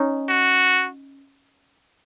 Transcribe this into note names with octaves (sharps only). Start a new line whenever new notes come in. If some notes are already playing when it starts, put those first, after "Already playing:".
Already playing: C#4 D#4
F#4